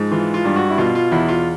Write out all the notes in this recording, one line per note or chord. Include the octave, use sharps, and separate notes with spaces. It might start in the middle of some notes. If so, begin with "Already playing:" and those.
Already playing: G#2 F3
E3 F4
F4
G2
F#4
E4
B2 F4
F4
E2 E4
F4